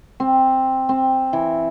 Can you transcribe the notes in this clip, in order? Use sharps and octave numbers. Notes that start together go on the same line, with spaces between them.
C4
C4
E3